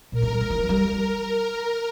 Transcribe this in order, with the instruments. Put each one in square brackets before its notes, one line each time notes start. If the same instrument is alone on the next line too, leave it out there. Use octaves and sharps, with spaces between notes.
[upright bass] A#2 [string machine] A#4
[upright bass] A3
G3
F3
E3
F3
G3